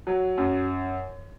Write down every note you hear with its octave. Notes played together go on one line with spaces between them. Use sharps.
F#3
F#2